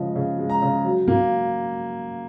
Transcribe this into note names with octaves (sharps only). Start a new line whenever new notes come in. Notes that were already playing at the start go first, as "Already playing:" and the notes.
Already playing: C#3 F3 G#3 D#5
C#3
G#3
A#5
C#3
F#3
A#3